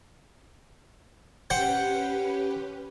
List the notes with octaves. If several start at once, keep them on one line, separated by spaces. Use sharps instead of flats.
C#4 G4 B4 C5 F#5 G5